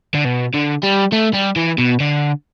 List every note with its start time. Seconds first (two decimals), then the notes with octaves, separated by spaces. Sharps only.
0.14 D3
0.25 B2
0.54 D3
0.83 G3
1.12 A3
1.34 G3
1.56 E3
1.78 B2
2.00 D3